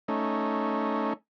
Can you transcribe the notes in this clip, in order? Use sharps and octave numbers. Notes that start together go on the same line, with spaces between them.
A3 C#4 D#4